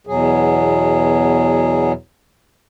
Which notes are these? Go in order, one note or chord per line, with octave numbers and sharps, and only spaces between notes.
E2 B2 F#3 G#4